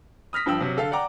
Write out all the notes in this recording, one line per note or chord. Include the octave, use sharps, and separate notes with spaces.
D#6 F6 A#6 B6
G2 F3 G5 E6
C3 F#3
D3 A4 F5
D5 F#5 G5 A#5 D6